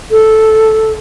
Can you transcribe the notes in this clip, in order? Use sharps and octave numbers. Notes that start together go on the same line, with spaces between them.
A4